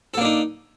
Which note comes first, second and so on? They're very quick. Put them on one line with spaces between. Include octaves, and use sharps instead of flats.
A4 A#3 D4 D#4